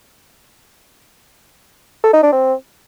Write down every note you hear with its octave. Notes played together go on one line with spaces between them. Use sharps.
A4
D#4
D4
C4